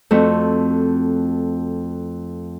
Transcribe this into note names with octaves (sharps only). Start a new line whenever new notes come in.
F2 A3 C4 F#4